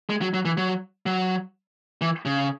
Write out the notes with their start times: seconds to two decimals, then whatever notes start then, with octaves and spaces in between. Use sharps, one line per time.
0.10 G#3
0.21 F#3
0.34 F#3
0.45 E3
0.57 F#3
1.06 F#3
2.01 E3
2.25 C#3